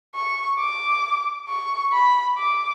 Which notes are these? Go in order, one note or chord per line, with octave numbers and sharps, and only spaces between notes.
C#6
D6
C#6
B5
D6